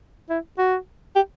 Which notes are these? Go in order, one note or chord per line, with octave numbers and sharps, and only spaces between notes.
E4
F#4
G4